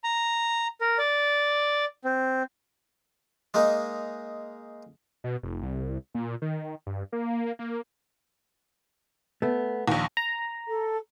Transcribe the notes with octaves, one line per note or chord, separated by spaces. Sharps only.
A#5
A#4
D5
C4
G#3 A#3 D#4
B2
F1
C2
A#2
D#3
G2
A#3
A#3
A3 B3
A#1 D#2
A#5
A4